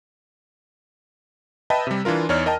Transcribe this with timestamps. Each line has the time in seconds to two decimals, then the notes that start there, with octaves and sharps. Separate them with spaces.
1.70 B4 D#5 E5 G5 A5 B5
1.87 C3 G3
2.05 E3 D4 F4 A#4
2.29 E2 D#4 C#5 D5 F6
2.46 A#4 D#5 G5 A5